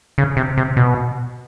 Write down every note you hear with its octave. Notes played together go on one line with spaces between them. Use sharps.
C#3
C3
C3
B2